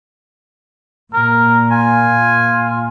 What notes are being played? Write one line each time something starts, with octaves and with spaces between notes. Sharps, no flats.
A#2 A#4
F4 G#5